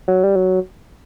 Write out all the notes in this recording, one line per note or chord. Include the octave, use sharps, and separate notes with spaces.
F#3
G3
F#3